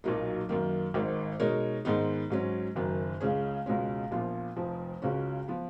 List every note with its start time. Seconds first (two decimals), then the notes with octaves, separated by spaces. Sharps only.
0.04 B1 A#2 F#3 A#3 D#4
0.49 F#2 D#3 A#3
0.94 G#1 G#2 D#3
1.40 B2 G#3 D#4 A#4 C#5
1.85 G#2 D#3 G#3 B3 D#4
2.30 G#2 F#3 C#4
2.75 F#1 F#2 D#3
3.20 C#2 C#3 G#3 C#4 G#4
3.66 C#2 B2 G#3 C#4
4.11 A#1 A#2 F3 B3 F4
4.56 F1 F2 F3
5.02 C#2 C#3 G#3 C#4 F#4
5.48 F3 B3